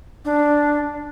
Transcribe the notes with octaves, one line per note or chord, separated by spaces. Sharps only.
D4